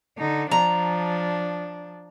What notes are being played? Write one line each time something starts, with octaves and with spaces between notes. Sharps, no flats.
D3 D#4
F3 D4 A#5